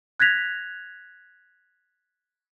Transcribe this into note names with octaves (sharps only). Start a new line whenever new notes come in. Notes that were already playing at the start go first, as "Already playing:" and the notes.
F#6 G#6 A#6 B6 F7